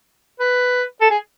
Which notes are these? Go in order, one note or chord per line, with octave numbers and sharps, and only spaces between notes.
B4
A4
G#4